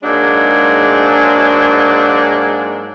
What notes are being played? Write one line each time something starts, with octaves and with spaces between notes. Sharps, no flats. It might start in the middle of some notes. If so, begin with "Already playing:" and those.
G#2 F#3 G#3 A#3 D4